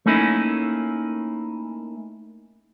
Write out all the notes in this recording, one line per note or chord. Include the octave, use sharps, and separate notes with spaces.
A3 A#3 C#4 D#4 E4